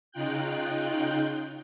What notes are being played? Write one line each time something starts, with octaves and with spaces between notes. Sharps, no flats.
C#3 D#4 F4 G5 F#6 G6